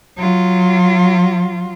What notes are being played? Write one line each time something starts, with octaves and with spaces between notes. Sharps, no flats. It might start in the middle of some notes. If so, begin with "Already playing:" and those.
F#3 F4